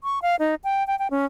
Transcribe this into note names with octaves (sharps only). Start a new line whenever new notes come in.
C#6
F5
D#4
G5
G5
G5
C#4